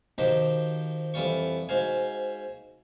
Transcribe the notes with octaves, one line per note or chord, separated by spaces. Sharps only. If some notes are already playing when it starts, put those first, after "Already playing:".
D#3 F3 D#4 F#4 G4 C5
F2 E3 G3 F4 C#6
G#2 F#4 C5 F5 G#5